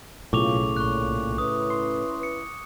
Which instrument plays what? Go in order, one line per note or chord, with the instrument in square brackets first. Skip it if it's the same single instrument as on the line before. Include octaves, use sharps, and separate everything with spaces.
[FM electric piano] B1 [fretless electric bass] A2 C#3 [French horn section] A#3 F4 [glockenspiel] C#6 D6 F7
[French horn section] A#2 [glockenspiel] C#6 F#6
[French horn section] C#4 E4 B4 [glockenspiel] D#6
[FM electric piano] C6
[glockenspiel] C#7